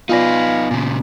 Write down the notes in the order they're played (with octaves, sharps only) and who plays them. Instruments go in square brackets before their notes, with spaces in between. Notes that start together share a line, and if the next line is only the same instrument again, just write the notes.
[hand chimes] B3 G#5 A#6 [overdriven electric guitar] D#4 B4 [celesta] F4 D5 [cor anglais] F5
[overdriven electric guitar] A#2 C#3